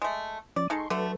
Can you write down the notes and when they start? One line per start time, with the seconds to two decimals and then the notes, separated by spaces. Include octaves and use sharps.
0.02 G#3 A3
0.56 F3 C#4 D5
0.70 G#3 D#4 A4 C6 C#6
0.90 D3 F#3 A3 A4 B4